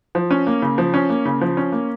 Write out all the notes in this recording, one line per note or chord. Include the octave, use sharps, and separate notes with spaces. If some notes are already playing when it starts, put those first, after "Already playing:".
F3
C#4
A#3
C#3
F3
C#4
A#3
C#3
F3
C#4
A#3